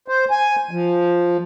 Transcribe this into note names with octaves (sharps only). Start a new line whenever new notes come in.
C5
G#5
F3